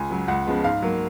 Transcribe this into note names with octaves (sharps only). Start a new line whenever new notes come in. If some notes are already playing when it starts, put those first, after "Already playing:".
Already playing: C#2 G#5
C#3 F#3
C#2 F#5
C#3 F3 G#3 B3
G#2 F5
F#3 A#3